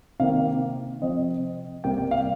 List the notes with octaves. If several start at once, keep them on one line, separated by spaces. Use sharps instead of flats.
C3 D#3 A#3 F5
C3 F3 C4 D#5
C3 G3 A#3 G5
G5
F5